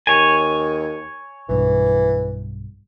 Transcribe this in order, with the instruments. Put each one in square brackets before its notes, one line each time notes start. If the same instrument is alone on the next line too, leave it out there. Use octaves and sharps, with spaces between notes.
[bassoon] D#2 [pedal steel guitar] C#5 G#5
[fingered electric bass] B1 G2 [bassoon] E3